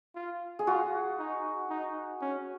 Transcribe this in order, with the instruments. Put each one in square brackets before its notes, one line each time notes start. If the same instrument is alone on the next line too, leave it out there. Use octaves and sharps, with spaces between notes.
[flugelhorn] F4
[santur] G#4
[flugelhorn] F4 [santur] F#4
[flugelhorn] D#4
D#4
C#4